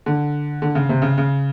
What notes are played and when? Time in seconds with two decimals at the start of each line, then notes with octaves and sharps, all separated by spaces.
0.06 D3
0.62 D3
0.75 C#3
0.89 C3
1.02 C#3
1.18 C#3